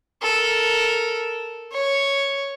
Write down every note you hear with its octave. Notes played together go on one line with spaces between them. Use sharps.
A4 A#4
C#5